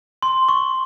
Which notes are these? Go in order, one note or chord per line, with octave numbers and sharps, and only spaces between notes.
C6
C#6